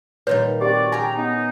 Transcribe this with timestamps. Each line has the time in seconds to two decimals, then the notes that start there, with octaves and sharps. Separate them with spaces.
0.27 A#2 D#3 G3 B4 C#5
0.61 C4 F#4 G4 D5
0.92 C#4 G4 G#4 G#5 A#5
1.16 B3 D#4